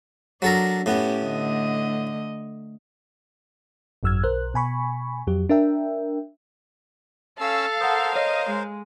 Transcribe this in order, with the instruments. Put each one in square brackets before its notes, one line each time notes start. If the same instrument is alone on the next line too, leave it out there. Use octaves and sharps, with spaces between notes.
[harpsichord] F#3 A4 A#4 [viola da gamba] D4
[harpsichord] A2 B3 [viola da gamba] C#4 G4
[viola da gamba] D3 A3 D#5
[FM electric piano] G#1 F#2 F#3 E6 F6 G#6
B1 A#4 C5 F#6
B2 G#5 B5 C#6
F2 F#3 G4
D4 A#4 E5 G5
[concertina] C#4 E6 [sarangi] A4 [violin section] F5
[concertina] A#4 C5 [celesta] F#5 D#6
[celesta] C#5 [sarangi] D#5
[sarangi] G#3